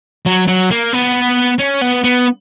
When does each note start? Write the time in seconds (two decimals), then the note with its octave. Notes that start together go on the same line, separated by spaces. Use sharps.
0.26 F#3
0.48 F#3
0.71 A#3
0.93 B3
1.59 C#4
1.81 B3
2.04 B3